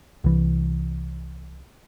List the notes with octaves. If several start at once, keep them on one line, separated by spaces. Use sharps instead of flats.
C2 E3